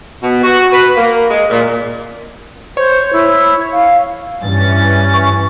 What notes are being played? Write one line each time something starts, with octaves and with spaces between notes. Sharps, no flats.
B2
F#4
B4
A#3
G#3
A#2
C5 C#5
E4
F5
G2 E3 C#4 A6
C#6